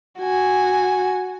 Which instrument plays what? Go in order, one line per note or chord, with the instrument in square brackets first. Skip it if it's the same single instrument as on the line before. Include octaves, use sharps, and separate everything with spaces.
[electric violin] F#4 G#5